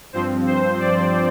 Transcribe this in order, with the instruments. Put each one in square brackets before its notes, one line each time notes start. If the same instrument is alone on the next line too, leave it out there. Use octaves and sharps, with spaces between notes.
[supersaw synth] G2 F3 C4 C5
C5
D5